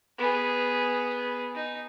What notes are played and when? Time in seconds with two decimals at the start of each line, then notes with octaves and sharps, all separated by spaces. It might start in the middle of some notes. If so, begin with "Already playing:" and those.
0.18 B3 G#4
1.55 D#4